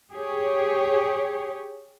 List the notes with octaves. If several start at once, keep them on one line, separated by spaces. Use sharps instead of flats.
G4 G#4 C#5